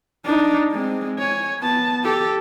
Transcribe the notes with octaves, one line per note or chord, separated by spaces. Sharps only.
D4 D#4
G#3 C4
C#5 G#5
B3 A5
G4 A4